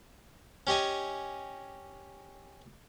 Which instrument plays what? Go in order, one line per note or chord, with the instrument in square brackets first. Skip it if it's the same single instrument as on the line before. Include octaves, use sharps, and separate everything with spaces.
[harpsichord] C#4 G4 D#5 G#5